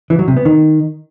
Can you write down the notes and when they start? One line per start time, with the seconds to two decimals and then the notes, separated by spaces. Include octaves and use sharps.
0.10 E3
0.19 F#3
0.28 C3
0.37 B3
0.45 D#3